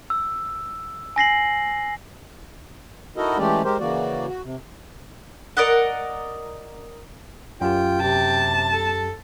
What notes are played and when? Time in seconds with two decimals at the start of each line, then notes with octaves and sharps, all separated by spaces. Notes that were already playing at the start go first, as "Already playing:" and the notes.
0.10 E6
1.16 G#5 A#6 C7 F#7
3.17 D#4 E4 F#4 A4 A#4 D#5
3.38 E3 G#3 A3 C#4 G4 D5
3.65 G#3 G4 A#4 C5
3.80 C#3 E3 A#3 F#4 D5
4.28 F#4
4.44 C3
5.57 A#4 D5 D#5 F#5
7.61 F#2 F4 G4 G5
8.02 C3 A5
8.71 A4